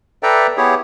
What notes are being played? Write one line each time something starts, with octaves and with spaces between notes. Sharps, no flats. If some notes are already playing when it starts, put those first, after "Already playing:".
A4 B4 D5 E5 G5 A#5
B3 E4 G4 G#4 C#5